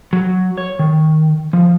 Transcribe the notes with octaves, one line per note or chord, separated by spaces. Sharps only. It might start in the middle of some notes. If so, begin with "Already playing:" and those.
F#3
C#5
D#3
F3